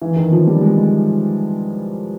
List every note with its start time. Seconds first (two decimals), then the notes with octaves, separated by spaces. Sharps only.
0.02 E3
0.16 D#3
0.32 F3
0.47 G3
0.61 G#3
0.77 G#3